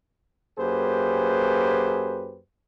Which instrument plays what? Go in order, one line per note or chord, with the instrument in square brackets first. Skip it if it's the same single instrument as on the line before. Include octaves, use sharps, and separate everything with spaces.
[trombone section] F#2 A#3 G4 G#4 B4 C5